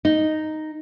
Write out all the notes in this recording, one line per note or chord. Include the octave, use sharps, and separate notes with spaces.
D#4